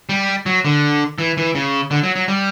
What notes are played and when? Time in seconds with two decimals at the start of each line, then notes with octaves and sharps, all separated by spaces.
0.09 G3
0.46 F#3
0.65 D3
1.18 E3
1.37 E3
1.55 C#3
1.91 D3
2.03 F#3
2.16 F#3
2.28 G3